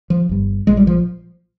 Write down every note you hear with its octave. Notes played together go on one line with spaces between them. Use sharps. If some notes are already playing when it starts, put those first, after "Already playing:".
F3
G1 G2
A#1 A#2 G#3
G3
F3